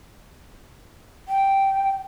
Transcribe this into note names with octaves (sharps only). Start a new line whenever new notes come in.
G5